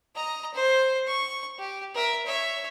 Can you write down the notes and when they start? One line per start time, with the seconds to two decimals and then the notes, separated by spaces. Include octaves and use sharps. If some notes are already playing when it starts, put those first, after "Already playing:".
0.16 D#5 A#5
0.54 C5
1.07 C#6
1.58 G4
1.94 A#4 E5
2.25 C#5 E5